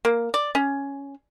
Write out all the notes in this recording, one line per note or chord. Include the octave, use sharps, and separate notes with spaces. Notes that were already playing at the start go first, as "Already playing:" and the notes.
A#3
D5
C#4